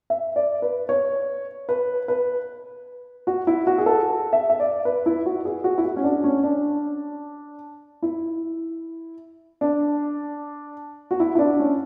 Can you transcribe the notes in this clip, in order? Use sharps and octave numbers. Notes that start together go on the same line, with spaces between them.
E5
D5
B4
C#5
B4
B4
F#4
E4
F#4
G#4
A4
E5
E5
D5
B4
E4
F#4
G#4
F#4
E4
F#4
C#4
D4
C#4
D4
E4
D4
F#4
E4
E4
D4
C#4